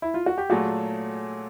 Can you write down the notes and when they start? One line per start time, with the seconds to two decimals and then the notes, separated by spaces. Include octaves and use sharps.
0.02 E4
0.14 F4
0.26 F#4
0.38 G4
0.50 A#2 F#3 A3 F#4 G#4